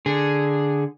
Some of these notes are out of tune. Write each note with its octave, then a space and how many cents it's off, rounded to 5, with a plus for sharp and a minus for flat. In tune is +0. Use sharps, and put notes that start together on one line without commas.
D3 +0 G#4 +0